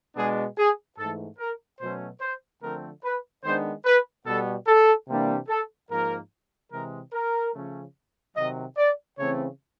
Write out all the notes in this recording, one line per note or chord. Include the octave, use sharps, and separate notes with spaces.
B2 G#3 B3 D4 G#4
G#4
G#2 E3 A3 A4
A#4
B2 F#3 A3 C#4 C5
C5
D3 F3 A3 C4 A#4
B4
D#3 G#3 B3 D4 C5
B4
B2 G3 B3 A4
A4
C3 E3 G3 A#3 D4
A4
G#2 F3 A#3 A#4
C3 E3 G#3 A#4
A#4
C#3 F3 A3 C#4
C3 D#3 F#3 D#5
D5
C#3 E3 A3 C4 C#5